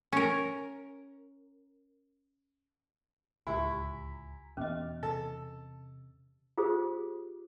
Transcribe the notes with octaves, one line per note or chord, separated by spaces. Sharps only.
C#4 A#4
D1 C#2 E4 F4 G4 G#5 A#5 B6
E2 B2 C#4 D#5 E5 D6 F6
C3 A4
F4 G4 G#4 C5 D#6